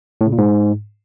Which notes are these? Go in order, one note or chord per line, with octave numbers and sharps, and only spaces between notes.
A2
C#3
A#2
G#2